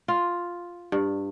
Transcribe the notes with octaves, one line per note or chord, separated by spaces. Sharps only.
F4
G2